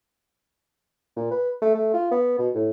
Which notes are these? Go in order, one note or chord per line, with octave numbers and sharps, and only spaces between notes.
A#2
B4
A3
A3
F4
B3
B2
A2